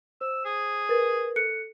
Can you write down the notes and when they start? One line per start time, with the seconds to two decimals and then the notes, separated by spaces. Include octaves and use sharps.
0.21 C5 E6
0.45 G#4
0.89 A#4 B4 A6
1.36 A4 F#6 C#7